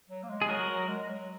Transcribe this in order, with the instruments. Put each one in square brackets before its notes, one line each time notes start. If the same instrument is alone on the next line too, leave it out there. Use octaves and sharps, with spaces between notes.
[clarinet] F#3
A#3
G#3
[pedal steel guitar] G#4
[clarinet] F#3 [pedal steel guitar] F#4 A#4
[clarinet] F#3
G#3
F#3